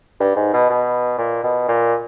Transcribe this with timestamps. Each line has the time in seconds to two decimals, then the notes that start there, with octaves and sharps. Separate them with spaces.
0.20 G2
0.36 G#2
0.54 B2
0.70 B2
1.18 A#2
1.44 B2
1.68 A#2